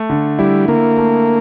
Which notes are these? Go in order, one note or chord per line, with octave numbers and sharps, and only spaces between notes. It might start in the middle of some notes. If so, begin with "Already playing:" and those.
Already playing: A3
D3
G3 E4
D3 A#3
A3